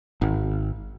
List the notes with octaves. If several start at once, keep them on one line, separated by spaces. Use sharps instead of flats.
G#1